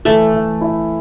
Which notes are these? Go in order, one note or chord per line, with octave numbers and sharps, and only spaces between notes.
E3 A3
E3
E4